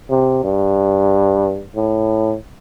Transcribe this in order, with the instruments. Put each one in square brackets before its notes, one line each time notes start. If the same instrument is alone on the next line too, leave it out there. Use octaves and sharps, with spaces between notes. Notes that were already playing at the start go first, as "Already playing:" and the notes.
[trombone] C3
G2
A2